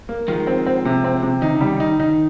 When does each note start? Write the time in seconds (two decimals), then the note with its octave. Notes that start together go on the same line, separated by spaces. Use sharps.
0.09 A#3
0.28 D#3 F3 G#3
0.47 C4
0.66 C4
0.85 C3
1.04 C4
1.23 C3
1.42 D#3 D#4
1.55 C#3
1.61 G3
1.67 D#3
1.80 D#4
2.00 D#3 D#4